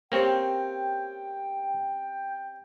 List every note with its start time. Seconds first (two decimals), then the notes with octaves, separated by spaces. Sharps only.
0.12 C3 A#3 C4 C#4 C#5 G5